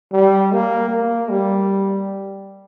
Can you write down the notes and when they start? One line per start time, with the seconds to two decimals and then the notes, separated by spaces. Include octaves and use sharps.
0.12 G3
0.52 A#3
0.90 A#3
1.29 G3